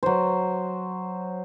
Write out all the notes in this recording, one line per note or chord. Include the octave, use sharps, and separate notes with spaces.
F#3 C5